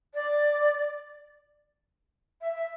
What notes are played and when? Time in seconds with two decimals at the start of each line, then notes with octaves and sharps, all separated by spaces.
0.14 D5
2.41 E5
2.55 E5